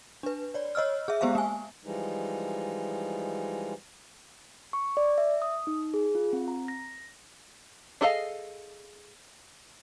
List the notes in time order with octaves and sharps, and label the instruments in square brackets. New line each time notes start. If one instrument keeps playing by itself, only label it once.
[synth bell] D4 B4
C#5 D5
C#5 D#5 E6 F6
G#4 E5
G#3 B3 G4 C5 E5 F5
A#3 G#5
[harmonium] E3 F3 G3 G#3 D#4
[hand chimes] C#6
D5
E5
D#6
D#4
G#4
F4
C4
A#5
A#6
[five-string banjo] D4 G#4 A4 D#5 F5